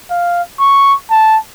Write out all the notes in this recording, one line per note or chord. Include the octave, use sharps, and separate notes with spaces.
F5
C#6
A5